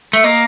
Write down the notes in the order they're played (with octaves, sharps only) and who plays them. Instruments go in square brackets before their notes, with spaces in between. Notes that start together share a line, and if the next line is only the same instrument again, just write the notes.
[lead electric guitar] A3 [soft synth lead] E5
[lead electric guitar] A#3 [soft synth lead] D#5